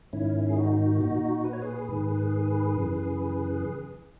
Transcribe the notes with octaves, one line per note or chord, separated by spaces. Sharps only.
G#2 D#3 C#4 E4
G#4
D#4 F#4
A#2 D#4 F#4
B4
C#5
G#4 B4
G#2 D#3
F#2 C#3 E3